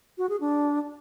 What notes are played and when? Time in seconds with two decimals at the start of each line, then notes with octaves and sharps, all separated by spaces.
0.18 F#4
0.29 G#4
0.40 D4